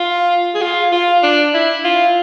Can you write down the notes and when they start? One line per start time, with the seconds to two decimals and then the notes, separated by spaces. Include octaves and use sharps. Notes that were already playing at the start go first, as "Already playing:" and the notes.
Already playing: F4
0.55 G#4
0.62 F4
0.92 F4
1.23 D4
1.54 E4
1.84 F4